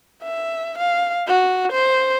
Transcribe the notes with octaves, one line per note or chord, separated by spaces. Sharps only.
E5
F5
F#4
C5